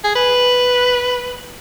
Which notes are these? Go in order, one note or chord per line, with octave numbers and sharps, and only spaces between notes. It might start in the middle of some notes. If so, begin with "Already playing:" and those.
G#4
B4